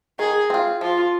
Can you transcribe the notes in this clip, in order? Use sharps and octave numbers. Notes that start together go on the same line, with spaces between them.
D#3 G#4
C4 F4
F3 F4